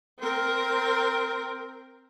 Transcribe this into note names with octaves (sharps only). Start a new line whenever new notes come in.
C4 A#4